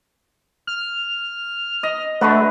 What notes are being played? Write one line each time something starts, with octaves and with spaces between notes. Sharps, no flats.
F6
D#5
D3 A3 F#4 B4